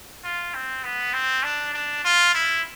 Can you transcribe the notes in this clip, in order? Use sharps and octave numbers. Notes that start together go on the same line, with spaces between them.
F4
C4
B3
C4
D4
D4
F4
E4